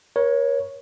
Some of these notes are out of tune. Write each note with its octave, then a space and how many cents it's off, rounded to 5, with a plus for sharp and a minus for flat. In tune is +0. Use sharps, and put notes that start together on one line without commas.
A#4 +40 C#5 +0